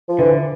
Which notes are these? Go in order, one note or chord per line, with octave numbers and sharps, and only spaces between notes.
F3
D3 E3